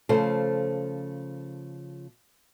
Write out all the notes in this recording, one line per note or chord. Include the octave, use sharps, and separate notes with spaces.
C#3 F3 A3 A4 C5